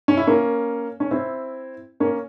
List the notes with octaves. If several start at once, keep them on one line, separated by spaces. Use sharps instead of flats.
C#4
E4
A#3 C#4
C#4
C4 E4
A#3 C#4